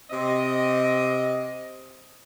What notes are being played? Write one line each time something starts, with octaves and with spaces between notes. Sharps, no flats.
C3 C4 D#5